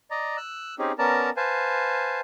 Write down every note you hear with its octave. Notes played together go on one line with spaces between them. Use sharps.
D5 D#5 A#5
E6 F#6
C4 C#4 D#4 G4 G#4
B3 C#4 A#4 D5 A5 A#5
B4 C5 F5 G#5 A5